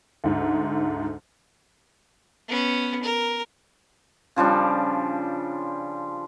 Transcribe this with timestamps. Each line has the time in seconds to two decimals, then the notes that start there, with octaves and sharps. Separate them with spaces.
0.24 D2 G#2
2.48 B3 C#4
3.03 A#4
4.36 C#3 F3 G3 D4